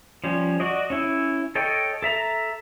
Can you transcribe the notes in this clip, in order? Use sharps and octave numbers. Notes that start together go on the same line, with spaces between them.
F3 G3 C#4
F#4 D5 D#5
C#4 E4
A4 C#5 D#5 G5
A4 E5 A#5